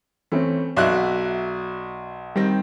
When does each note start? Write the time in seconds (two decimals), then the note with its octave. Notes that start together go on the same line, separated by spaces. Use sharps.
0.32 E3 A3 C4 C#4
0.76 B1 F#4 D5 E5 F5 F#6
2.36 D#3 G3 C4 A#6